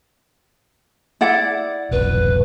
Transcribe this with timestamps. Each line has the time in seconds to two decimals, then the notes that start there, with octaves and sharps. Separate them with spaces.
1.21 E4 D5 F#5
1.91 F1 B1 B4